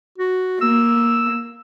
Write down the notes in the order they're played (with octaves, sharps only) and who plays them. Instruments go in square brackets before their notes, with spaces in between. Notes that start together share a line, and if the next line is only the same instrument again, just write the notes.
[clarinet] F#4
[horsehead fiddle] A#3 [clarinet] E6